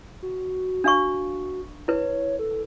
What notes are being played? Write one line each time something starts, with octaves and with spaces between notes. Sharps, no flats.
F#4
D4 F5 C#6
E4 B4 C#5
A4